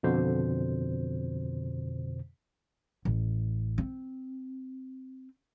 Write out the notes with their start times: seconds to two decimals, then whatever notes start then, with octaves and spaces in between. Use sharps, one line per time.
0.03 F2 B2 D3 C5
3.05 A1
3.78 C4